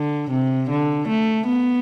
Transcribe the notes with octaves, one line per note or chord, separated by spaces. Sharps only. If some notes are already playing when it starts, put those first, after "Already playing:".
Already playing: D3
C3
D3
A3
B3